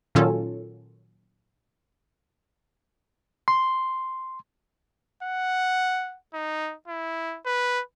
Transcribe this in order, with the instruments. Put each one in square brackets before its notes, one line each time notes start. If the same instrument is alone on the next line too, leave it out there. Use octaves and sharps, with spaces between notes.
[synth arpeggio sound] A#2 D#3 F#3 C#4 F4 A4
[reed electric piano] C6
[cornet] F#5
D#4
E4
B4